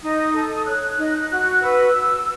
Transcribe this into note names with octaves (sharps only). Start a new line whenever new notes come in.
D#4 D#6
A4
C#5 F#6
D#4
F#4 F#6
B4 E6